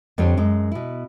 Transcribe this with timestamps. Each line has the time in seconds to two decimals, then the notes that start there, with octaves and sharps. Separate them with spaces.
0.18 F2 D3 C4 G4 C#5
0.37 F#2 G#3
0.72 B2 E4